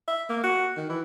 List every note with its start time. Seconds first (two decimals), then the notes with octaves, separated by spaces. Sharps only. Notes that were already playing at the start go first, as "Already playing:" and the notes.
0.08 E5
0.30 A#3
0.44 F#4
0.77 D#3
0.89 E3